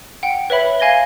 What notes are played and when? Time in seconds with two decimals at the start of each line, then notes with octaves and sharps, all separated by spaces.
0.23 F#5 G5
0.50 B4 C#5 E5 B5
0.80 F5 G#5 G#6 A#6 G7